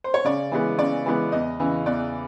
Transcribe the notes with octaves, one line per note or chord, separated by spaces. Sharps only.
C5
C#5
C#3 D5
E3 G#3 B3
C#3 D5
E3 G#3 B3
E2 D#5
C#3 E3
E2 D5